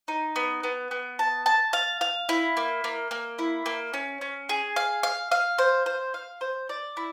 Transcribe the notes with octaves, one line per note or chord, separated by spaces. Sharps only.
D#4
B3
B3
B3
A5
A5
F5
F5
E4
A#3
A#3
A#3
E4
A#3
C#4
C#4
G#4
F5
F5
F5
C5
C5
F5
C5
D5
E4